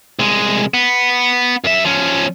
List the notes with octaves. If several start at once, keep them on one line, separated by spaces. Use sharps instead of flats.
C2 G#3
B3
F#2 E5
F3 C#4